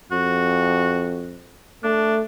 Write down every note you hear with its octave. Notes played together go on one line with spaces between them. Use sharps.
F2 F#4
A3 D4